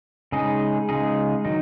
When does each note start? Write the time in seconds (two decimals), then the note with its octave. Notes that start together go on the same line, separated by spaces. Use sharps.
0.32 C#3 G#3 D#4 G#4
0.89 C#3 G#3 D#4 G#4
1.45 D#3 F#3 D#4